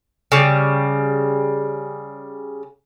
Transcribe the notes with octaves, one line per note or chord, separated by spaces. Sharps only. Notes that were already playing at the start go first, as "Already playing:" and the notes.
C#3 G3